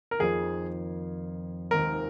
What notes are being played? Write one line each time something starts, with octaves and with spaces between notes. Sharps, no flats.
A#4
F2 D#3 A#3 F4 G#4
F1 D#2 D#3 G#3 C4 A#4